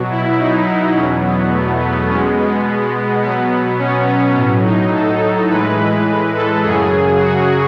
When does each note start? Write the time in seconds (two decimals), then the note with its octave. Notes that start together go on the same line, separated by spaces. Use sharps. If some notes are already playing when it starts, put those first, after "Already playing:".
Already playing: B2 F#3
0.11 E4
0.38 D#4
0.95 E2 B2 F#3 C#4
1.24 B3
1.52 A3
1.80 B3
2.08 B2 G#3 C#4
2.37 B3
3.22 B2 F#3 B3
3.79 C#4
4.08 C#4
4.36 A2 F#3 C#4
4.64 D#4
4.93 A4
5.50 A2 E3 G#3 B4
6.35 A4
6.63 F#2 C#3 F#3 G#4
7.20 F#4